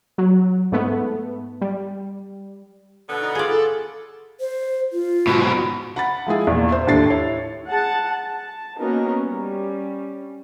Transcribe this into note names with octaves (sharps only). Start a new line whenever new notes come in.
F#3
G#2 A3 B3
G3
B2 D3 B3
D#4
F4 G#4 D5
A4
C5
F4
G#2 B2
F#5 B5 A6
F3 G#3 E4 G#4
E2 A#2
C5 E5
D#2 A2 D4 A6 C7
E4 C#5
G#4 F#5 A5
A5
A#3 B3 C#4 D#4 F#4 A#4
G3 C#4